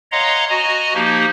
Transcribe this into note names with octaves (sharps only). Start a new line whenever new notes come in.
C#5 D#5 F5 F#5 A#5 C6
F#4 D#5 G#5 A#5
F3 A#3 D#4 G4